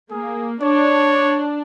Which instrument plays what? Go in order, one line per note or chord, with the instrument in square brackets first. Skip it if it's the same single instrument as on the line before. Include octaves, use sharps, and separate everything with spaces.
[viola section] A#3 [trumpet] G#4
[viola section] D4 [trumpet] C#5